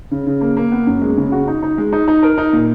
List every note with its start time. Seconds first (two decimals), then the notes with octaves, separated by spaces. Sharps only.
0.11 C#3
0.27 C#3
0.41 A#3
0.57 A#3
0.72 B3
0.87 F#2
1.02 G#3
1.17 C#3
1.32 F#4
1.48 D#4
1.63 D#4
1.78 G#3
1.93 D#4
2.08 D#4
2.23 A#4
2.38 D#4
2.53 A#2